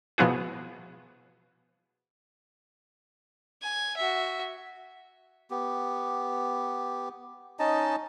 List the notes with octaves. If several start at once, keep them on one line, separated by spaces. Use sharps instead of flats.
B2 F3 B3 E4 F#4 G#4
G#5
F#4 E5
B3 G4
C#4 D#4 D#5 A5